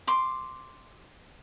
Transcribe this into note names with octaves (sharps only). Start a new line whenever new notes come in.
C6 D6